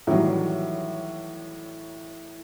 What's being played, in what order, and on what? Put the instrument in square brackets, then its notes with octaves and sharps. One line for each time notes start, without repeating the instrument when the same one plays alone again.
[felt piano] A2 D#3 E3 F#3 G3